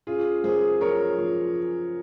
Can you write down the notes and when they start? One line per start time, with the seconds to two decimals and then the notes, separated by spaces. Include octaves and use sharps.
0.07 C#4 F4 G#4
0.44 F#2 G#4 C5
0.81 F3 A#4 C#5
1.18 F3